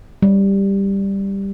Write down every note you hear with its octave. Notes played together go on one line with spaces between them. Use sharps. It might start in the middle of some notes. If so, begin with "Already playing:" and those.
G3